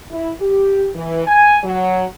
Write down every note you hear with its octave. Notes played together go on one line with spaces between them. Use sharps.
E4
G4
E3
G#5
F#3